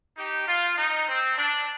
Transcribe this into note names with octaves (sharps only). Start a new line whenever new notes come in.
D#4 G4
F4
D#4
C4
D4